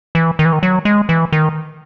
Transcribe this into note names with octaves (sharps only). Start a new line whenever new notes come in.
E3
D#3
E3
D#3
F#3
G#3
E3
D#3